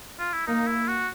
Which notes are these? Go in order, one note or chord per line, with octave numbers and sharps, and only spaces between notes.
F4
E4
A#3 D#4
E4
F#4